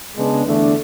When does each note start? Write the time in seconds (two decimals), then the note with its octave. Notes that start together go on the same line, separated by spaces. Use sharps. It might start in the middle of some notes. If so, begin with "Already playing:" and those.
0.17 C#3 G#3 B3 D4
0.45 E2 D3 A3 D4